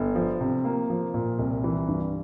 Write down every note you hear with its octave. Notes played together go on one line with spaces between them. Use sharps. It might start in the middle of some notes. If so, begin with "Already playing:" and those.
Already playing: G1
F3
C3
A#3
F3
A#2
C2
E3
G2